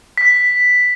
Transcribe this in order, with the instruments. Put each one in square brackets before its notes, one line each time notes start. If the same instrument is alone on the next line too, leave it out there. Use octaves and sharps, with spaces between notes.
[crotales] B6